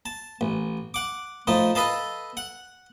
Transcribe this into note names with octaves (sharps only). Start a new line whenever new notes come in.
A5
A1
F#5 D6
A2 F3 D#4 A5
A4 B4 D#5 F5 A5
F#5